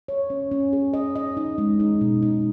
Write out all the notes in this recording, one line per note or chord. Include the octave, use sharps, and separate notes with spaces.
C#5
C#4
C#4
G#4
D#5
D#5
D#4
G#3
D#4
B2
D#4